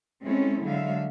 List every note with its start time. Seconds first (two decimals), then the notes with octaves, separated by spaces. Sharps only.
0.23 G#3 C4 C#4 E4 A4
0.63 D3 F#3 G#3 E5 F5